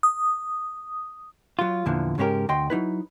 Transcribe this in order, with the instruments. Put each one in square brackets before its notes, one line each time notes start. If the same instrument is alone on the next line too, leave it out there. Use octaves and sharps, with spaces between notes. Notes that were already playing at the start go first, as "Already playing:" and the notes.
[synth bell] D#6
[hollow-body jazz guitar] F#3 F4
E2 A#2 D3 E3 F3
G#2 C#3 G#3 C#4 G4 A#4
D2 D#5 G5 C6
F#3 D#4 E4 B4